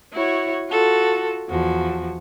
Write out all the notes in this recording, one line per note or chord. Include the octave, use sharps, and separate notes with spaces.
E4 F#4 C#5
F4 F#4 A4
E2 F3 F#4